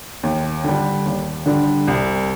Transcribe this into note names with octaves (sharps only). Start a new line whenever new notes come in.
D#2
D3 G3 D4
D#2
D3 G3 D4
C2